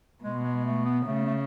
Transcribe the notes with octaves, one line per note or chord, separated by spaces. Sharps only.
B2 G#3
G#3
G#3
A3
B3
C#3 A3
A3